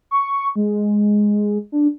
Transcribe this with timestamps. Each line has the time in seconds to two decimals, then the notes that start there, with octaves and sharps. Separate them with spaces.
0.11 C#6
0.56 G#3
1.72 D4